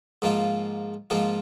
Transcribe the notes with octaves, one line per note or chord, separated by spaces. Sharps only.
G#2 F3 A#3 F4
G#2 F3 A#3 F4